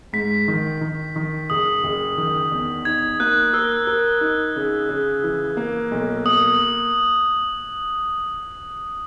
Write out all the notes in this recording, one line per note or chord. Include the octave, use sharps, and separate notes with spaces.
G#2 B6
D#3
D#3
D#3
F#1 D#6
F#1
D#3
E2
D#4 G#6
A#3 F#6
A#4 E6
A#4
D#4
C#3
C#3
E3
A#3
B1
A#3 D#6